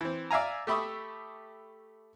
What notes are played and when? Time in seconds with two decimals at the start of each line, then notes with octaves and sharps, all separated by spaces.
0.01 E3 C4
0.31 D5 E5 F5 G#5 A#5
0.67 A3 G4 E5 B5 C#6 D#6